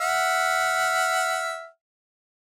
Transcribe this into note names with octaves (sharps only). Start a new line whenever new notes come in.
E5 F#5 F6